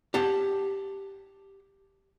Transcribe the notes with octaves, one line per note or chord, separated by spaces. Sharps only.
G4 F#5 A5